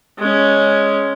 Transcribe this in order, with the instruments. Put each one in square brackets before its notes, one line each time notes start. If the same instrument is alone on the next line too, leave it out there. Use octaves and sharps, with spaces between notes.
[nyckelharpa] G#3 C#4